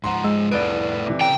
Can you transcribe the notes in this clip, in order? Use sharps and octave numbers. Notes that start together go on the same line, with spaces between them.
G#2 F3 F#5 A#5 C6
G#3 E6
F1 C2 A2 E4 G#4 B4 D5 D7
C3 E3
C#3 A4 G5 A#5